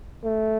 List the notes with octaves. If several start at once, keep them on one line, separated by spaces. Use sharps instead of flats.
A3